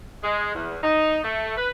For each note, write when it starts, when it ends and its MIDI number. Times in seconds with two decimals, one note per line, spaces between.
0.23 0.51 56
0.55 0.77 40
0.83 1.18 63
1.24 1.57 57
1.57 1.69 71